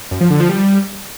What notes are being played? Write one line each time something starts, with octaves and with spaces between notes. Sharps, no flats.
F#2
F3
D3
F3
G3